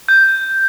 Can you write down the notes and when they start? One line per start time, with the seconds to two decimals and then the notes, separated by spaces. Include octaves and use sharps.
0.08 G6